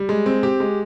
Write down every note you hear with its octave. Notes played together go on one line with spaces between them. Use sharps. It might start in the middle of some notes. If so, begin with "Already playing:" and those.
Already playing: G3
G#3
C4
G4
G#3